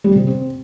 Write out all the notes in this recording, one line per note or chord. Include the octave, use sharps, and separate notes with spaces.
G3
C3
C4